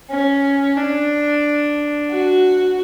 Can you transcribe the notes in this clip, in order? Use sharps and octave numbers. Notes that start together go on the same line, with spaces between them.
C#4
D4
F#4